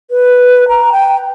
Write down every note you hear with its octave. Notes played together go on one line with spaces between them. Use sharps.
B4
A#5
G5